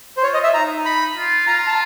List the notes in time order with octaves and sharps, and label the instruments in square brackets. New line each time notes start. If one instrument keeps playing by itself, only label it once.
[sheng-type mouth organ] C5
[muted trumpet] F4 [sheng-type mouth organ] C#5
[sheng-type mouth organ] D#5
E5
[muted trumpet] D#4 [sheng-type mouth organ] A#5
[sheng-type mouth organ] B5
[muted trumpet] F4
[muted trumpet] F4 [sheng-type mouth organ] A#5
[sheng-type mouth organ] A#5
A5